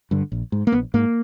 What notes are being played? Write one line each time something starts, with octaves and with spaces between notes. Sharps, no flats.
G2 D3
A#1
G#2
A#3
A#1 B3
G#2 A#3